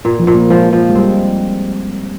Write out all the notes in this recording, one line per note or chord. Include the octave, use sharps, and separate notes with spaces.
A#2
F3
A#2
A#3
F3 G#3
F3
G#3
G3 C4